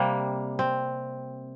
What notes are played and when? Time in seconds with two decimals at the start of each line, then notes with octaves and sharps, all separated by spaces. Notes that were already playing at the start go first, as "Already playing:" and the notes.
Already playing: C3 G3 A#3
0.59 C4